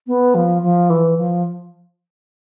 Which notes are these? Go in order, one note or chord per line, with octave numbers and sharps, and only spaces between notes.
B3
F3
F3
E3
F3